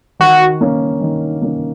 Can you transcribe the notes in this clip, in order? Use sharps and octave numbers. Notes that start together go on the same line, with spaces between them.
D#3 F#4
A#3 C#4
D#3
A#3 C#4